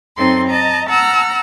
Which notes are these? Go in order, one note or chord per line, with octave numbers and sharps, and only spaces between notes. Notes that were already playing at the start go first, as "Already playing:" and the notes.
F#2 C4 D#4 A4 C6
D#5 A5 A#5
F#5 A5 A#5 E6 F6